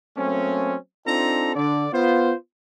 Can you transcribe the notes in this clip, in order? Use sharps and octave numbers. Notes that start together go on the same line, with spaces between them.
F#3 A3 A#3 C4 C#4
C4 D4 D#4 F4 A4 A#5
D3 D4 D5
B3 F4 C5